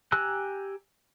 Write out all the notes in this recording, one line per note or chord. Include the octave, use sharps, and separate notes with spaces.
G4 G#5 A#5 E6 F#6